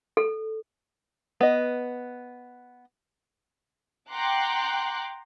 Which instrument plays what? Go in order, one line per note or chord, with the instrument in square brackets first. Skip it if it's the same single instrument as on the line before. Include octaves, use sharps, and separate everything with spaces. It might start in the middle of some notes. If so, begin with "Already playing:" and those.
[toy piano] A4
[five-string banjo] B3 D#5
[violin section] F#5 G5 A#5 C6 D6 F#6